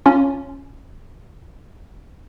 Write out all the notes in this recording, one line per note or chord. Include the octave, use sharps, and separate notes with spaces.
C#4 F4